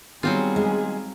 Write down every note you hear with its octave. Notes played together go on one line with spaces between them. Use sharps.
D#3 F#3 G3 B3 C4 F4 F#4 G#4
G#3